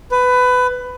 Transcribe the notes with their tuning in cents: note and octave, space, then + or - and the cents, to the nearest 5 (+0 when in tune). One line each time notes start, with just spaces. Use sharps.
B4 +20